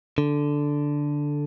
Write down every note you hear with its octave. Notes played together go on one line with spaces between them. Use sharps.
D3